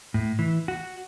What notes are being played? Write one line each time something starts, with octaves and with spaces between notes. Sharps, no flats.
A2
E3
F#4